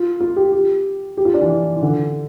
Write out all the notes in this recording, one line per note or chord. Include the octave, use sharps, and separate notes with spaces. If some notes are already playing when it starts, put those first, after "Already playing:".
Already playing: F4
F4
G4
G4
G4
F4
D4
E3
E3
D3